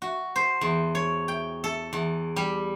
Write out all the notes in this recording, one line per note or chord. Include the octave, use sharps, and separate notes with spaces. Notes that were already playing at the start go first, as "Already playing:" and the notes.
F#4
C5
E2
C#5
G5
A4
E2
G3